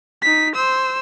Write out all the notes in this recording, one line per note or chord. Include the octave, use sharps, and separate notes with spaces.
D#4 B6
C5 E6